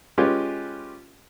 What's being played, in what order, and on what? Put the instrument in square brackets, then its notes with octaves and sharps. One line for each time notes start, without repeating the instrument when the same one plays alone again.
[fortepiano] G#3 C#4 F4 G4 B4